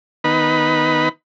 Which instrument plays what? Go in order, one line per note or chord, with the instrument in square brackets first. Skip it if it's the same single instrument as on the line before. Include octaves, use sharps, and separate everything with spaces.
[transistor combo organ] D#3 B3 D#4 B4 B5